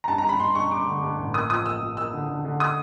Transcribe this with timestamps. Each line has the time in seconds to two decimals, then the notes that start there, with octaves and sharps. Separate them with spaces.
0.04 A#5
0.08 G2 A5
0.18 A#5
0.24 G2
0.29 B5
0.40 G2 C6
0.55 G2 C#6
0.71 G2 D6
0.87 D3
1.03 G2
1.19 A1
1.34 A#3 D#6
1.50 F3 D#6
1.66 A#3 E6
1.81 F3
1.97 A#3 E6
2.13 D3
2.29 D3
2.45 D3
2.60 D#6